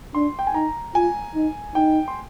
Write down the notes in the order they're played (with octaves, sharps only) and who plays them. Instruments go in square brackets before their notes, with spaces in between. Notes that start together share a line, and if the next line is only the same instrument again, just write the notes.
[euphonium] D4 [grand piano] C6
[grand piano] G5
G#5
[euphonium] D#4 [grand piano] A#5
[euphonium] F4 [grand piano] G#5
[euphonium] D#4
[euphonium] D#4 [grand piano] G5
[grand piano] C6